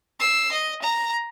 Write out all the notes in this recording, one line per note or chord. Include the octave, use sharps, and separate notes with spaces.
E6 C7
D#5
A#5